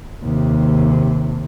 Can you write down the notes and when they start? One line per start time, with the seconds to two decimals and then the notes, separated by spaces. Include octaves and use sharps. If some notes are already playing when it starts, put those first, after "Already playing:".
0.23 D#2 C3